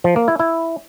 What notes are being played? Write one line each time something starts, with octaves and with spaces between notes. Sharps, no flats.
F3
A#3
E4
E4